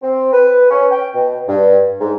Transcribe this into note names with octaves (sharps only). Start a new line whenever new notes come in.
C4
B4
C#4
G5
B2
G2
G#2